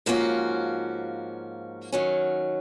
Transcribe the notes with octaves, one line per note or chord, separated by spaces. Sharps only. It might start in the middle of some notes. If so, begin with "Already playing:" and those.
G#2 F3 A#3 C#4 F#4
D#3 F#3 C#4